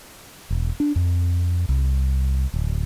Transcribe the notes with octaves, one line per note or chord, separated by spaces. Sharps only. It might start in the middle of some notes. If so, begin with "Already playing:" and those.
E1
D4
F2
C2
D1